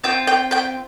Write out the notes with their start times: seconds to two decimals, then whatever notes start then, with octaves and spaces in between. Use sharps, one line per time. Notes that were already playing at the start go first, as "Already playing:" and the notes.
0.04 C4 F4 G5 G6
0.27 G5 G6
0.51 G5 G6